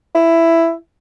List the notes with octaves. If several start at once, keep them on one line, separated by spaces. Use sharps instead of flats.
E4